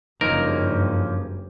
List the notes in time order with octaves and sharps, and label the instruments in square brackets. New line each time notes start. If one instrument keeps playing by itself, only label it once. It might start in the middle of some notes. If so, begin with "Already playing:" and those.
[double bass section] F#1 G2 [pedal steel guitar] F3 A#3 C#4 [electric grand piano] D#4 [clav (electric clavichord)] A#4